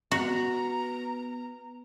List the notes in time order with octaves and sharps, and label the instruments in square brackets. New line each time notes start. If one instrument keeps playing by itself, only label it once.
[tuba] B3 [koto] F#4 [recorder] A#5